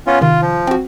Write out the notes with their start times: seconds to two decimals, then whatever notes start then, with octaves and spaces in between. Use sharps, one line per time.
0.07 B3 C#4 F4
0.21 C3 D#3 F4
0.42 F3
0.67 C4 F#4